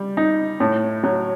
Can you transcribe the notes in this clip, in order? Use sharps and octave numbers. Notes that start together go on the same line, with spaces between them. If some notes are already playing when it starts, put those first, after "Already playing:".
Already playing: G3
D#4
A2
F#3